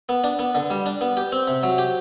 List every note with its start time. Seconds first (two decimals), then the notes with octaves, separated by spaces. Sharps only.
0.09 B3
0.24 D4
0.39 B3
0.55 D3
0.70 G3
0.86 D4
1.01 B3
1.17 G4
1.32 C4
1.48 C3
1.63 F#3
1.78 G4